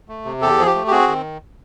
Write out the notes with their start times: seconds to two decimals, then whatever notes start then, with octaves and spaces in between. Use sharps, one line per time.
0.09 A3
0.25 C3
0.41 E2 G4 A4
0.58 F3 G#4
0.66 G4
0.75 A3
0.87 G4
0.91 C4 F#4 G#4
1.08 D#3